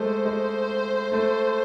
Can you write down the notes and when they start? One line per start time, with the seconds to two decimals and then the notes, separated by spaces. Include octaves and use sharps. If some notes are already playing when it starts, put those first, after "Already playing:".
Already playing: G#3 A3 C5
0.25 G#3
1.12 A3